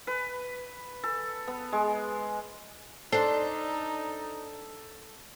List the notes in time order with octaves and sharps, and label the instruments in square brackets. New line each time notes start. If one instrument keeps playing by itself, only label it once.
[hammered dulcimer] B4
A4
B3
G#3
[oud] D4 C5 [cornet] D#4 [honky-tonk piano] A4